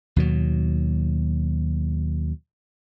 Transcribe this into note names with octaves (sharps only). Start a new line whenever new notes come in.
D#2 B2 F#3